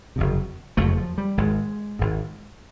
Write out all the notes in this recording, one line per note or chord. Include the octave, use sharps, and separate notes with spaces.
F#1 F2 C3
F#1 F2 C3 A3
F3
G3
G#1 G#2 G#3
G#1 G#2